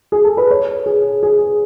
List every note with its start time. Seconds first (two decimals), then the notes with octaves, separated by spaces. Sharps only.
0.12 G#4
0.25 A4
0.37 B4
0.51 C#5
0.86 G#4
1.23 G#4